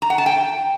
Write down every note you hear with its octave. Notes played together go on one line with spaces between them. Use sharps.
A#5
F#5
A5
G5